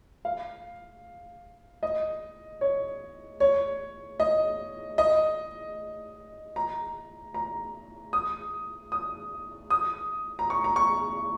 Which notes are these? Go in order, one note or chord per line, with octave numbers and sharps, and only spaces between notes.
F5
D#5
C#5
C#5
D#5
D#5
A#5
A#5
D#6
D#6
D#6
A#5
C#6
A#5
C#6